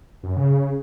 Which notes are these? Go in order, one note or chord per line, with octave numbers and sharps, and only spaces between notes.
F#2
C#3